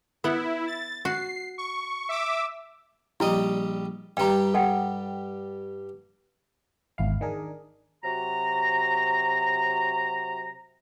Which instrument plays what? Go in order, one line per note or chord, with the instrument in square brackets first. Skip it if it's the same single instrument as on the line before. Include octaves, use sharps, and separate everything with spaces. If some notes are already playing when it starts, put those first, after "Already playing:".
[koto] B3 F#5 [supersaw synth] E4
[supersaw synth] A6
[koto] F#4 [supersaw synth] C7
[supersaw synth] C#6
E5 D6 E6
[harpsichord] A#1 G3 D#5 [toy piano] E4
[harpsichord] G2 G3 [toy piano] G5 A#5
[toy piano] A4 F#5 G5
[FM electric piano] G#1 E2 E4 F5
D#3 D4 G#4 A#4
[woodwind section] C3 F#3 F#4 A#5